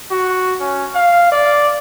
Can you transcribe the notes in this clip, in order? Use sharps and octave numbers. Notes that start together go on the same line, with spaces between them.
F#4
C#4
F5
D5